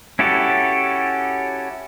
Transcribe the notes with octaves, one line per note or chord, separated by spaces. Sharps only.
C#4 E4 F#4 G4 A4